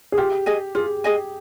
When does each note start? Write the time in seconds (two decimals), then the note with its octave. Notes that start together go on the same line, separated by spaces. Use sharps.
0.12 G#4
0.17 F4 G4
0.46 G#4 D#5 G#5
0.75 F4 G#4
1.04 G#4 D#5 G#5